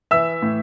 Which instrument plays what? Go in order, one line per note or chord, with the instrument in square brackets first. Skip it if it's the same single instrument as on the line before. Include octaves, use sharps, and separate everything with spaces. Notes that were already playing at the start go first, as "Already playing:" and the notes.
[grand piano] E3 E5 E6
A2